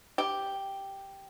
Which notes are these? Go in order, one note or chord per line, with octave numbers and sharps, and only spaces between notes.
G4